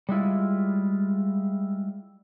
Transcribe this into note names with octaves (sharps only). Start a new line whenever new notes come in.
G3 G#3 E4 F4